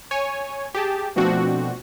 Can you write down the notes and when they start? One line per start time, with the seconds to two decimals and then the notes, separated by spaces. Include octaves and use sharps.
0.11 C#5 G#5
0.75 G4 G#4 A5
1.16 B2 F3 A3 C4 D4 F#4